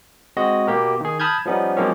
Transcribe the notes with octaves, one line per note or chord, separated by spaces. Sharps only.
G#3 C4 F#4 D#5
B2 A#3 G4 A#4
D#3 G#4
A5 B5 D#6 F6 G6 G#6
F3 G3 B3 C#4 D#4
F3 F#3 G#3 A#3 C4 C#4